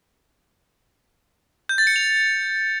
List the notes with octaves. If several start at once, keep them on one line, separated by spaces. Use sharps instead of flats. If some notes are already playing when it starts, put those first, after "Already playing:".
G6
A6
C#7
F7